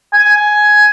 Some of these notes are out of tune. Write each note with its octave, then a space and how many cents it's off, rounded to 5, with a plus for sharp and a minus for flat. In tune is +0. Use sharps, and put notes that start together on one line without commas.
G#5 +10